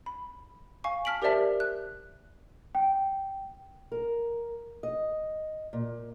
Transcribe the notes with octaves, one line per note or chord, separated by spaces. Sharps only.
B5
F5 G#5 C#6
A5 F6 B6 D7 F#7
G4 A#4 C5 D5 E5 A5
F#6
G5
A#4
D#5
A#2